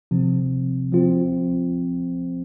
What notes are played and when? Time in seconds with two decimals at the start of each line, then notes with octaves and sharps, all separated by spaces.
0.11 C3 F3 C4
0.92 F3 C4 F4